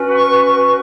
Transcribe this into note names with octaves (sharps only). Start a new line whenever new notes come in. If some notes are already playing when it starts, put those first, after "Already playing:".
Already playing: C#4 F#4 B4
C#6
C#6